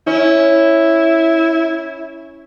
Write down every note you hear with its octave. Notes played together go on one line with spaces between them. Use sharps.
C#4 E4